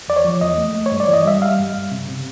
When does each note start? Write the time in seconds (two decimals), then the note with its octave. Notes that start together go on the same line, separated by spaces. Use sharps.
0.08 E2 D5
0.16 C#5
0.24 F3
0.41 E2 D#5
0.58 A3
0.75 A3
0.86 C#5
0.92 G2
1.00 D5
1.08 E3
1.14 D#5
1.25 G3 E5
1.41 G3 F5
1.59 G2
1.75 G2
1.92 C3
2.08 C3